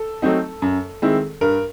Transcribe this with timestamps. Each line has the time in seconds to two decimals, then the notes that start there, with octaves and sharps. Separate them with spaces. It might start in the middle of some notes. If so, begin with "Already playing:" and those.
Already playing: A4
0.22 F#3 A3 C4 D#4
0.62 F#2
1.02 D#3 G#3 C4 E4
1.41 G2 A#4